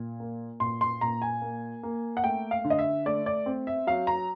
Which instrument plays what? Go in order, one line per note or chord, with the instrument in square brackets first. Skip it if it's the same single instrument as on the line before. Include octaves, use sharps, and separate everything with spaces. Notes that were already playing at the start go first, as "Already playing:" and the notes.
Already playing: [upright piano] A#2
A#3
A#2 C6
C6
A#2 A#5
G#5
A#3
A#3
F#5
A3 G5
F5
D3
D#5
E5
A3 D5
D5
C4
E5
F#3 F5
A#5